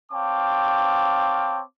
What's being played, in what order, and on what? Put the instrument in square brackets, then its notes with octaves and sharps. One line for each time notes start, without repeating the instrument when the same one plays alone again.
[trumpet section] C4 C#5 F5 G5 A5 D6